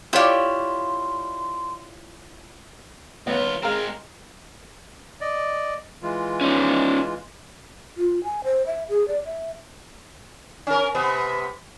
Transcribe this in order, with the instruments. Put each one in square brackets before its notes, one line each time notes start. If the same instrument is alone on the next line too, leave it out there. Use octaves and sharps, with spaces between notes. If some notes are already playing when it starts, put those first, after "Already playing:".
[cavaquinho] E4 F4 [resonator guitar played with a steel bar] G4 C#5 D5 [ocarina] C6
[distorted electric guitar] D#2 F4 [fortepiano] B3 [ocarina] C#5
[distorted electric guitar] G#3 C4 [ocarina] G#4 [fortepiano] A#4 F5
[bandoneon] D5 D#5
E3 G#3 F4
[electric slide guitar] C#4 D#4
[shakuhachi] F4
G#5
C5
E5
G#4
D5
E5
[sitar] C#4 A#4
C3 B3